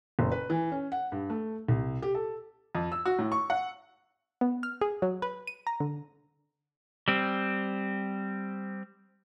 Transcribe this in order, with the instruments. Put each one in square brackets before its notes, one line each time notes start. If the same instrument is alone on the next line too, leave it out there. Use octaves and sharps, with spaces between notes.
[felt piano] F#1
B4
E3
C#4
F#5
G2
A3
C2
G4
A4
[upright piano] F2
E6
F#4
A2
C#6
F#5
[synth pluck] B3
F6
G#4
F#3
B4
D#7
A#5
D3
[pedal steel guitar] G3 C4